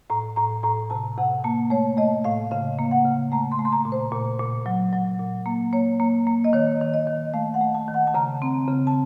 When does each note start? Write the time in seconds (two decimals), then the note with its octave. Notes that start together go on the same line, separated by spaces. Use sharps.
0.10 A2 A#5
0.36 A2 A#5
0.63 A2 A#5
0.90 C3 A5
1.17 C3 F#5
1.44 A#3 A5
1.70 A3 C#5
1.97 A3 D#5
2.24 A2 F5
2.51 C#3 F5
2.79 A#3
2.91 F#5
3.05 C#3
3.32 A3 A#5
3.52 C6
3.59 A3
3.65 C6
3.72 A#5
3.85 A#2
3.92 C5
4.12 A#2
4.40 A#2
4.66 F#3
4.93 F#3
5.20 A#2
5.46 A#3
5.73 A#3 C#5
6.00 A#3
6.27 A#3
6.44 D#5
6.53 D#3 C#5
6.81 D#3
6.94 D#5
7.07 D#3
7.34 A3 F5
7.54 F#5
7.61 A3
7.74 A5
7.88 D#3
7.94 F#5
8.07 A5
8.14 C#3 A#5
8.42 C4
8.68 C#3
8.87 A5